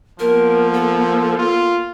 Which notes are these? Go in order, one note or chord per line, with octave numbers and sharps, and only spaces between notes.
F3 A#3 B3 A#4
A4
F4